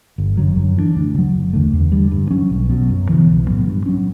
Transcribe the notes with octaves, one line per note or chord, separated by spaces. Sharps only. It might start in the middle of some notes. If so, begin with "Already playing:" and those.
G1
F#2 D3 F#3
F#2
E3 B3 D4
D2
C#3 F#3
F#1
E2 D3 A3
E2
D3 G3
G2
F#3 C#4
B1
B2 F#3
F#2
C#3 E3 B3
B1
A2 F#3 B3
G2
F#3 C#4